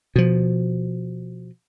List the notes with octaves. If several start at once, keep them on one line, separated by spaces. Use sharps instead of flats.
B2 F3